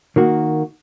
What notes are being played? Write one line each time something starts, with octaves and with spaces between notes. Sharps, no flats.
D#3 A#3 F#4